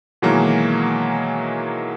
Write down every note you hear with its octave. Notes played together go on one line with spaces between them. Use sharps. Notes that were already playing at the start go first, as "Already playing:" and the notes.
B2 D#3 E3 F#3 G#3 A#3